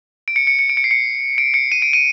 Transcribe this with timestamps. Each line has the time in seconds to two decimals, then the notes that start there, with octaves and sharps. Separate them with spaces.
0.28 D7
0.36 C#7
0.47 C#7
0.59 C#7
0.70 D7
0.77 C#7
0.84 C7
0.91 C#7
1.38 D7
1.54 C#7
1.72 D#7
1.82 D7
1.93 D#7